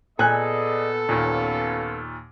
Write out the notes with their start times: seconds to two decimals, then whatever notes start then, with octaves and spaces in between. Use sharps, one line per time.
0.19 A#2 B3 G#4 A4 D5 D#5 G#5 F#6
1.09 D#2 A#2 C#4 F4